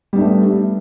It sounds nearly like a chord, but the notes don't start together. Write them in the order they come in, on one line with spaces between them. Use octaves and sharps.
G3 B3 D4 A3